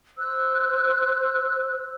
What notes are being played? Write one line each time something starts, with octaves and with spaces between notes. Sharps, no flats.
C5 E6 F#6